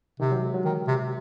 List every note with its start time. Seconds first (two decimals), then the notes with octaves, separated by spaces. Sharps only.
0.20 C3 D#3
0.32 F#3
0.42 G#3
0.54 F#3
0.65 D#3
0.88 C3